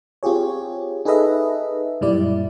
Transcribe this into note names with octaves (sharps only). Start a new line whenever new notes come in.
C4 F4 G4 G#4 C#5
D#4 G#4 A4 B4 D#5 E5
F#2 A#2 G3 E4 D5